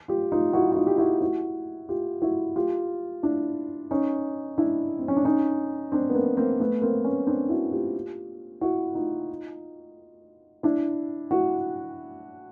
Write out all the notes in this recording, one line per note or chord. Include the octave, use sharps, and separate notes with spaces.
F4 G4
D#4 F4
E4 F#4
F#4
D#4 F4
G4
E4 F#4
E4 F#4
F4 G4
E4 F#4
F4 G4
D4 E4
C#4 D#4
D4 E4
C4
C#4
D4
C#4 D#4
C4 D4
B3
A#3 C4
A#3 C4
A3 B3
A#3 C4
B3 C#4
C4 D4
E4 F#4
F4 G4
E4 F#4
D#4 F4
D4 E4
E4 F#4